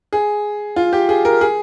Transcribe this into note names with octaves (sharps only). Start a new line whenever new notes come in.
G#4
F4
G4
G#4
A#4
G#4